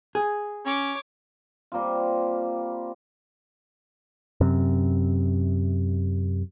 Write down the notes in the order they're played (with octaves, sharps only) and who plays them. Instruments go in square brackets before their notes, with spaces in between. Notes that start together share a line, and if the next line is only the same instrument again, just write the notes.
[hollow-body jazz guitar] G#4
[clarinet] C#4 [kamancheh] C#5 D6
[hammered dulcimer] G3 A#3 C4 F4
[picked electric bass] F#2 C3